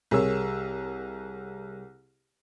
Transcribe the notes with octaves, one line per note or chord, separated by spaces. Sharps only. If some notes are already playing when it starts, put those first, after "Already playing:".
C2 G#4 A#4 C#5 E6